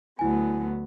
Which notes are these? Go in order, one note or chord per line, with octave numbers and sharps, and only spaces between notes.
D2 F#3 B3 E4 G#5